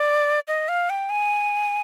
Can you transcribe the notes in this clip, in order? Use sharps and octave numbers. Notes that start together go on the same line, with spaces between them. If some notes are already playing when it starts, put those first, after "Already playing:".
Already playing: D5
D#5
F5
G5
G#5